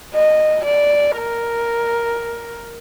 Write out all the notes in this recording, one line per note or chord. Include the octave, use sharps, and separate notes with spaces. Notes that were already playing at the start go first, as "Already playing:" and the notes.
D#5
D5
A#4